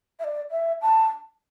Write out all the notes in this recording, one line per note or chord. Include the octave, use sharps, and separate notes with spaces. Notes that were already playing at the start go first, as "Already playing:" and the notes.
E5
D5
E5
A5